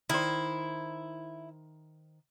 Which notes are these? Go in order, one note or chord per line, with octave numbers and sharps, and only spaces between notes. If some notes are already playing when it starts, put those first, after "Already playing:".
D#3 E4 C5